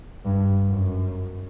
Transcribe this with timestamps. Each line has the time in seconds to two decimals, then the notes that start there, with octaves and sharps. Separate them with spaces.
0.25 G2
0.68 F#2